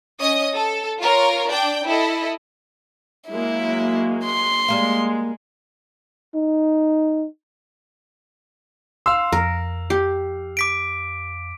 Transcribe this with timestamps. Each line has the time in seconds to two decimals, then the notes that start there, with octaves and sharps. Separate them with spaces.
0.20 C#4 D#5 D#6
0.55 A4
0.99 F4 A#4 C#5
1.49 D4 D5 G5
1.85 E4 A4 D#5
3.29 F#3 G#3 A#3 E4
4.24 C6
4.68 G3 G#3 A#3 F5
6.35 D#4
9.06 F5 C6 E6
9.32 F2 A#4
9.90 G4
10.57 D6 B6 D7